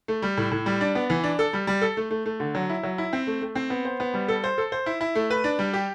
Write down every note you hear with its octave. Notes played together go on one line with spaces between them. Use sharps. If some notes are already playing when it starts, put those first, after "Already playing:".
A3
G3
A2
A2
G3
D4
B3
E3
D4
A4
G3
G3
A4
A3
A3
A3
D3
F#3
E4
F#3
E4
C4
A3
A3
C4
B3
C5
B3
G3
A4
C5
A4
C5
E4
E4
A3
B4
D4
G3
G4